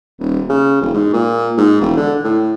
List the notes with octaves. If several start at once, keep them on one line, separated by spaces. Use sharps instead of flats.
D#1
C#3
E1
G#2
A#2
G#2
E1
D3
A2